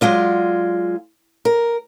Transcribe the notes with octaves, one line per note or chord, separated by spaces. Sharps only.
F#3 G#3 F4 D5
A#4